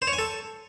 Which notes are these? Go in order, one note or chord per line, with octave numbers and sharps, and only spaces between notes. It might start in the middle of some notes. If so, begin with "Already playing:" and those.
C5
C#5
G#5
A4